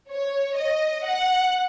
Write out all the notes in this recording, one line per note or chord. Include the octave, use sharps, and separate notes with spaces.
C#5
D#5
F#5